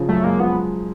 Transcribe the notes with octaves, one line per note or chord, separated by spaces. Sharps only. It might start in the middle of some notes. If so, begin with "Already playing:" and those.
Already playing: C#3 F3
F#2 A3
G#3 A#3
F3 B3